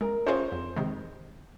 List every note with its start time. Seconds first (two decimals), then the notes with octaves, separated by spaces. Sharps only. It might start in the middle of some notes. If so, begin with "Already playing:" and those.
0.01 G#3 A#4
0.26 C#4 F4 G#4 C5 C#5
0.52 F2
0.76 C3 D#3 G#3